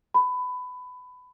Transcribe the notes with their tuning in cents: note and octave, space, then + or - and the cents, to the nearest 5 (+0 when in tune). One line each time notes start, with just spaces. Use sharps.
B5 +20